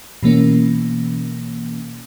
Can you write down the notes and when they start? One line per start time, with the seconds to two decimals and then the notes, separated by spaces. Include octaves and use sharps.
0.23 B2 E3 A#3 C#4